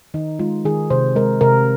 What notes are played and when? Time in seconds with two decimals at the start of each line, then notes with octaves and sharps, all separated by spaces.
0.14 D#3 D#4
0.39 G#3 F4
0.65 D#3 G#4
0.90 C3 C5
1.15 G#3 A#4
1.41 C3 A#4